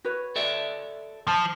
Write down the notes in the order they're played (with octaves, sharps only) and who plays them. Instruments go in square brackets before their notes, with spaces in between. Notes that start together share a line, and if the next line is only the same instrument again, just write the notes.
[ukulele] F#4 B4 C#5
[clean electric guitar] A4 D5 E5
[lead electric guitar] F3 [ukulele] A5